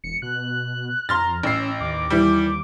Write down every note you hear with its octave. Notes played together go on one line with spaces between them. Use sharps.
E1 C#7
B2 F#6
F2 A#5 C6 F6 A6
A1 C#4 E6 C7
D#2 D6
E3 G3